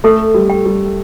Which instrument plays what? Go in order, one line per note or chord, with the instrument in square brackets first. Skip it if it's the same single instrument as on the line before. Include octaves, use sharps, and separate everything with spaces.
[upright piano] A3 [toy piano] A4
[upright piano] G3
[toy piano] G5
[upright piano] G3